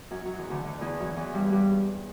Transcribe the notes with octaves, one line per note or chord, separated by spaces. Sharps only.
F#2 F#3
F#2 F#3
E2 E3
D2 D3
D2 D3
E2 E3
F#2 F#3
E2 E3
G2 G3
G2 G3